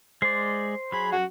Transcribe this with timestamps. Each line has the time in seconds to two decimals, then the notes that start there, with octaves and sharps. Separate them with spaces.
0.22 G#3 C5 D5 C7
0.92 F#3 G#4 B5
1.12 F#2 F#4